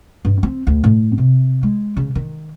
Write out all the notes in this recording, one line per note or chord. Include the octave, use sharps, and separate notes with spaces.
G2
C4
D2
A2
C3
G#3
C#3
D#3